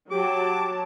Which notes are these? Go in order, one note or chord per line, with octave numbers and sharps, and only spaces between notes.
F#3 G4 A5 D6